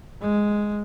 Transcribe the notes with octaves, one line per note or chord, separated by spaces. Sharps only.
G#3